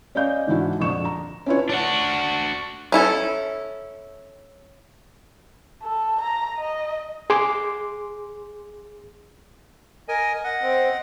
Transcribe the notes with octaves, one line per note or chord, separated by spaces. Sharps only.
C#4 D5 D#5 F5 G6
G#2 D3 E3 D4 E4 F#4
A#1 F2 D3 D4 C#6 E7
A#5
C#4 D4 E4 F4 B4 C#5
D4 F#4
C#4 E4 A4
A4
A#5
D#5
G#4 C6 D6
A#4 D#5 G#5
D#5 F#5
C4